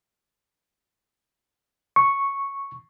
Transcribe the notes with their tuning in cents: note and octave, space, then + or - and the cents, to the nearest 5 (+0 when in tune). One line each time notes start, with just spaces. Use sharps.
C#6 -5